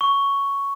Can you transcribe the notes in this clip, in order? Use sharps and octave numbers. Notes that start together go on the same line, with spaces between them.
C#6